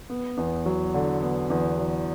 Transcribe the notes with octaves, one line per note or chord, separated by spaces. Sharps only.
B3
E2
F#3
D3
B3
E2
F#3